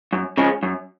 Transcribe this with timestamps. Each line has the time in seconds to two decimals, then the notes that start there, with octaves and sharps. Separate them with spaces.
0.13 F#2
0.38 C#3 F3 G#3 C#4
0.63 F#2